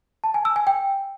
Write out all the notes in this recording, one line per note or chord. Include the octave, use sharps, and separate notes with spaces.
A5
G#5
E6
G#5
G5